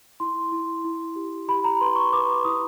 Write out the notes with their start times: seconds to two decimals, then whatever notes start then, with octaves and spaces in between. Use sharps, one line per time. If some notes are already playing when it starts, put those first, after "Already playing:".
0.20 E4 C6
0.52 E4
0.85 E4
1.16 G4
1.48 G4 B5
1.64 A#5
1.81 B4 C6
1.96 C#6
2.13 B4 D6
2.45 E4 D#6